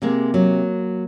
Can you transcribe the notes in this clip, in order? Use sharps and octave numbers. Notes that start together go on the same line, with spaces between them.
C3 G#3 A#3
F#3